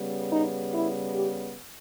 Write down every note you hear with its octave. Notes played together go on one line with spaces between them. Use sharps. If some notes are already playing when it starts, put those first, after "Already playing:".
Already playing: C#3 G3 B3
D#4
E4
G4